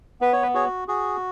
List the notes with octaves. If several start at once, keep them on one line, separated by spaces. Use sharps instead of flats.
B3 B4
C#5
B4
F#4 G#4 C#5
F#4 G#4